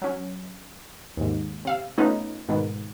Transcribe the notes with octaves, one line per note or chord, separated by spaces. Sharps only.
F#3 C#4
D#2 G#2
C3 F5 E6
A3 B3 C#4 D#4 F4 B4
G#2 B2 D#3 B3